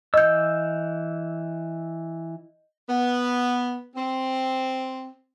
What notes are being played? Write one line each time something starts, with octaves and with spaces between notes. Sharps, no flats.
E3 D#5 E6 G6
B3
C4